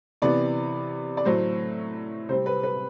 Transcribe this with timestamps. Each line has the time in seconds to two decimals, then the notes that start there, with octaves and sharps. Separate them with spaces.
0.22 C3 E3 B3 D5
1.17 D5
1.25 A2 F#3 A3 C5
2.29 C3 G3 C4 C5
2.46 B4
2.63 B4